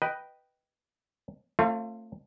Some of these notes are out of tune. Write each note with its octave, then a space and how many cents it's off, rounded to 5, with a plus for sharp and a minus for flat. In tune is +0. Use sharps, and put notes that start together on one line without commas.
B4 +0 D#5 +0 G5 -10
A3 +30 C4 +45 F4 +0